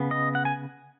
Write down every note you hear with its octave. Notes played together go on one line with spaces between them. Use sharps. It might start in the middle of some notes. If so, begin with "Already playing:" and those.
Already playing: C#3 B3
D#5
F#5
G#5